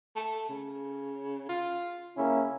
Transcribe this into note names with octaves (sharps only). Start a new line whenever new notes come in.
A3
C#3
F4
C#3 A#3 C#4 E4